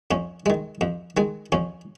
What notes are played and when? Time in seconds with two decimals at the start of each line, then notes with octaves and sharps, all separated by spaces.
0.11 F2 C#4
0.46 D#3 G#3
0.81 F2
1.17 D#3 G#3
1.52 F2 C#4